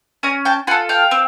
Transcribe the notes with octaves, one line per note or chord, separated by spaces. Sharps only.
C#4 G#5 A#5
G5 A5
F4 A4 F#5 G#5
F5 G5
C4